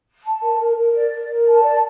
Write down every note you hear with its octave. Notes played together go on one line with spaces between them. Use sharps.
A5
A#4
A#4
A#4
D5
A#4
A#4
A5
D5